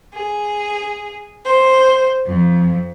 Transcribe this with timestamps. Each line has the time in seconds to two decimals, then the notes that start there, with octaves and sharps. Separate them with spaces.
0.14 G#4
1.46 C5
2.26 F2